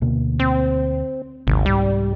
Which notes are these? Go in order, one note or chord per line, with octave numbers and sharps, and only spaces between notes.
D2 B2 A#3
C4
G#1 D#2 C3
C2 G#2 G3